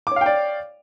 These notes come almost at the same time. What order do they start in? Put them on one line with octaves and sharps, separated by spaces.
D6 C#5 F5 G5 D5